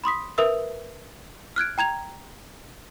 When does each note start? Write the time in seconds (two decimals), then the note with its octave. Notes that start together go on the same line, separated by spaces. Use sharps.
0.04 B5 C6 D#6 B6
0.38 A#4 B4 E5 D#6 E6
1.56 F6 F#6 G#6 D7
1.78 G5 A#5 G#6 F7